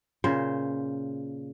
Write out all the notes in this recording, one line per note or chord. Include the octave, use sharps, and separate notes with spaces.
A#2 C#3 C5